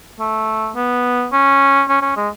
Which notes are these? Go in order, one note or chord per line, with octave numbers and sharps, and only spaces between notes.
A3
B3
C#4
C#4
C#4
G#3